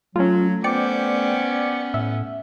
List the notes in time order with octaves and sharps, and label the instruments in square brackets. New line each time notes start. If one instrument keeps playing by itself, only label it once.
[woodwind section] F#3 [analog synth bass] A3 [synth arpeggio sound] C#4 F4
[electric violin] B3 C#4 [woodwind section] C5 D6 [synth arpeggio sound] D5 G5 C#7
[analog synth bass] A2 [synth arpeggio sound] E5